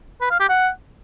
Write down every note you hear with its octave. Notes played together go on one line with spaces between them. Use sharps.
B4
F5
G4
F#5